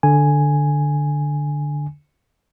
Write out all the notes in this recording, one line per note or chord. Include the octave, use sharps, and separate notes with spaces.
D3 G#5